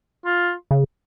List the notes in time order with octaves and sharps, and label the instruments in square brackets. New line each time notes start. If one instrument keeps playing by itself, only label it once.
[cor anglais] F4
[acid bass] C#3